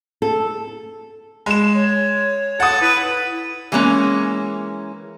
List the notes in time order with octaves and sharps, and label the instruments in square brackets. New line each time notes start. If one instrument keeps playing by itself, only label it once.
[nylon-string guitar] A4
[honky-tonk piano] G#3 E7
[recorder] C#5
[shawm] A4 [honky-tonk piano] F#5 D#6
[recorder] E4 [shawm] B4
[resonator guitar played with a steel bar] E3 G#3 A#3 C#4